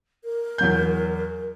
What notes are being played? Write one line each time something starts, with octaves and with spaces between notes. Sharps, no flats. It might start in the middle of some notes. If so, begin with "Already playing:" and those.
A#4
E2 F#3 G6